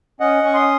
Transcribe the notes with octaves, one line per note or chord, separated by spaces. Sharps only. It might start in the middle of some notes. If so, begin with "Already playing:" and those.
C#4 D#5 F#5
C#4 C#6
C6 D#6